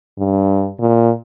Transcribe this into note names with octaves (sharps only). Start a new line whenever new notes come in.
G2
A#2